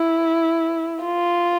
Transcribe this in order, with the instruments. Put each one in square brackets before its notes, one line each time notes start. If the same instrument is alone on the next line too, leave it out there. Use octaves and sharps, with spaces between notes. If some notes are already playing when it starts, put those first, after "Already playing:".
Already playing: [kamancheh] E4
F4